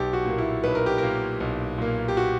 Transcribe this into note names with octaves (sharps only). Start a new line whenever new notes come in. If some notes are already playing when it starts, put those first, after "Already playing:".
Already playing: B1 G4
F#4
A#2 A#3
E4
B1 B4
A#4
G4
A#2 A#3 A#4
B1
A#2 A#3
G4
F#4